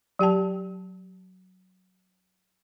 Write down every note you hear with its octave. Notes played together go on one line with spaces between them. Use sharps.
F#3 G4 G5 A5